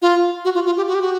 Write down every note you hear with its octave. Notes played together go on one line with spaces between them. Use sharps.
F4
F#4
F4
F4
G4
F#4
G4
F#4